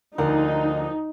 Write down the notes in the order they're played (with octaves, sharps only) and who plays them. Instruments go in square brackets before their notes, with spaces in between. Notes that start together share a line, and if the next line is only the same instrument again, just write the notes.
[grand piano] D2 [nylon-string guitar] F3 A#4 [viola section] D#4